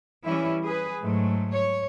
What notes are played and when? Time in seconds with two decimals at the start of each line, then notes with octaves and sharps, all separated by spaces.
0.25 E3 G3 C#4 E4
0.62 G#4 B4
1.02 G#2 F#3 A3
1.52 C#5